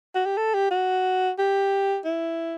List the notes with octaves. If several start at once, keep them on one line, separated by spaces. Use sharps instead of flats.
F#4
G4
A4
G4
F#4
G4
E4